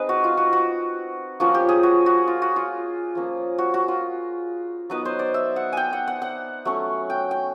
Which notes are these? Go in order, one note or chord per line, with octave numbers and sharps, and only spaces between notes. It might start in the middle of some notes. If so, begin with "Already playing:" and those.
Already playing: G#3 C4 D#4 B4
F#4
F4
F#4
F#4
F3 A#3 C#4 F4 F#4
G4
G#4
F#4
F#4
F4
F#4
F4
F3 A#3 C#4
F#4
F#4
F4
F#3 B3 D#4 B4
C5
D5
E5
F#5
G5 G#5
F#5
F#5
F#5
F#3 A3 C#4
G5
G5